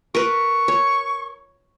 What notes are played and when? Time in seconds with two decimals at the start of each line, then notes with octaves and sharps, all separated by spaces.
0.15 A#4 B4 C#6
0.68 C#5